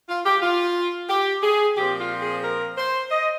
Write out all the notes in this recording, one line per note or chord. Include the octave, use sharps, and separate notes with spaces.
F4
G4
F4
G4
G#4
A#2 F3 C4 G4
F4
G#4
A#4
C5
D#5